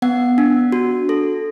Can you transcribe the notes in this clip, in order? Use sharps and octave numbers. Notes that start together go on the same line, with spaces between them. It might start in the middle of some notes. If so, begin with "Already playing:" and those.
B3 F#5
D4
F#4
A4